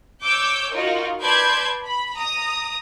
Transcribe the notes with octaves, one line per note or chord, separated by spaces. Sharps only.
C#5 D6 E6 G6
D#4 F4 F#4 A#4
B4 D5 A5 C6 G6 G#6
B5
A#5 D#6